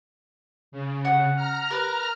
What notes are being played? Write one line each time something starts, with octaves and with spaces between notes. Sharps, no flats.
C#3
F#5
A#5 F6
A#4 B4